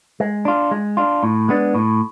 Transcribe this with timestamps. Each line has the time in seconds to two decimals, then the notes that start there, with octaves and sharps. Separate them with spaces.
0.20 G#3
0.45 D4 F4
0.71 G#3
0.97 D4 F4
1.23 A2
1.49 G#3 B3 D4
1.75 A2